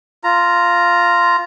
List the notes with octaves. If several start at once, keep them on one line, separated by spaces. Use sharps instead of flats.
F4 A#5